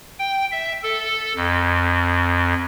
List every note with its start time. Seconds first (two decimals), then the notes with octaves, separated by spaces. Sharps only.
0.19 G5
0.51 E5
0.83 A4
1.36 F2